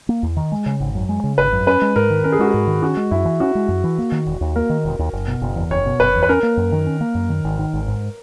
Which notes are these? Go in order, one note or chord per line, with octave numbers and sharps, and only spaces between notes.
A#3
E2
D#3
G#3
C#3
G#1
F#2
G#3
C#3
G#1 B4
F#2
C#4 B4
G#3
G#2 A#4
D#3
C#4 A#4
G#4
G#3 F#4
G#4
G#2
D#3
C#4 F#4
G#3
F#2 E4
E3
C#4 F#4
G#3
F#2
E3
A#3
D#3
E1
D#2
A#3 A#4
D#3
E1
D#2
F#1
B2
F#1
E2
F#1 C#5
B2
F#1 B4
E2
B4
C#4 A#4
A#3
F#2
D#3
C#4
A#3
F#2
D#3
G#1
D#3
G#1
G#2